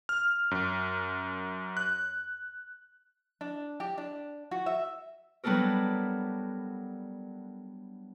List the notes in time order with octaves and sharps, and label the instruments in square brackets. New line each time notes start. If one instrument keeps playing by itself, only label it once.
[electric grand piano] F6
F#2
F#6
[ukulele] D4
G4
D4
F#4
E5
[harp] F#3 G3 B3 D4 A4 A#4